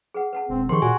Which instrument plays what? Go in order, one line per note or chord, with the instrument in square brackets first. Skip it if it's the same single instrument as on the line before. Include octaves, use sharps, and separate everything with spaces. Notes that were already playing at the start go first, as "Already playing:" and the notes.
[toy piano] G#4 B4 F#5
B4 F#5 A5
[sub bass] E1 [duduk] C4
[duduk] D#3 [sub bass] F3 [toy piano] G4 G#4 [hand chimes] C6 C#6
[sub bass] A#2 [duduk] F#4 [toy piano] E5 [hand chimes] G#5